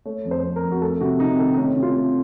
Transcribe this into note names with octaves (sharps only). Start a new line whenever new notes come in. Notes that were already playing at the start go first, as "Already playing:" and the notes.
A3 C#5
F2
C5
F2
A#4
F2
F#4
A3 A4
C3 F#4
C3 D#4
D#3 A4
D#4
A3 C#4
C3
F4
A3